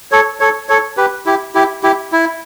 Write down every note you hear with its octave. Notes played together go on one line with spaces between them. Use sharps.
A4 C#5
A4 C#5
A4 C#5
G4 B4
E4 G4
E4 G4
E4 G4
E4